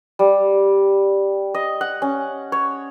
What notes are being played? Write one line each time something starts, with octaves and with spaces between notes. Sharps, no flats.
G3
D#5
F#5
C#4
C#5